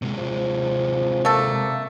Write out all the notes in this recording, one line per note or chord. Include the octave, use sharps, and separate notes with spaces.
C3 G#3
F3
A3 A#3 A4